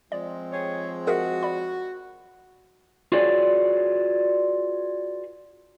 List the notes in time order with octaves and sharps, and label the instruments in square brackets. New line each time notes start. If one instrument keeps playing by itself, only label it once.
[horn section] F3 G#3 C4 [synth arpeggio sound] D5
[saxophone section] G4 G#4 C#5
[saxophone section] F#4 [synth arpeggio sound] G#4 A#4 E5
[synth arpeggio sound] D5 B5
[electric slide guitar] F4 F#4 G#4 B4 C#5 D5